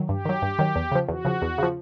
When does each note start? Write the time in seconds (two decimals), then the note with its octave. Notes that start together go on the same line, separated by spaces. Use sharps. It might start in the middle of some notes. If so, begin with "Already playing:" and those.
Already playing: D#3 F#3
0.09 G2 G4
0.25 D#3 F#3
0.42 G2
0.59 D#3 F#3
0.75 E2
0.92 C#3 F3
1.08 E2 F#4
1.25 C#3 F3
1.42 E2
1.58 C#3 F3